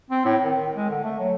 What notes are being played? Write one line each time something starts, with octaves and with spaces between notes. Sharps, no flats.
C4
A2
D#3
D#3
G#3
D3
A3
F#3